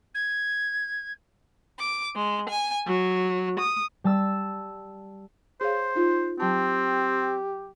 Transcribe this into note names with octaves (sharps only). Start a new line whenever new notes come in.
G#6
D6
G#3
G#5
F#3
D#6
G3 A5 E6
G#4 C5 C#5 F5
D#4 F4
F#3 C4 G4 A5